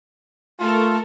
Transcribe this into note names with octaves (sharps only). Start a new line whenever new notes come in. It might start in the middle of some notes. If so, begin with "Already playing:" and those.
A3 F4 A4 A#4